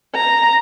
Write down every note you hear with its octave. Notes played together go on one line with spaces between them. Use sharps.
A#5